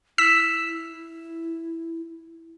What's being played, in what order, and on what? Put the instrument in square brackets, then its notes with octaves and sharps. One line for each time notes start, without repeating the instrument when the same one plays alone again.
[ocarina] E4 [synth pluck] E6 B6 E7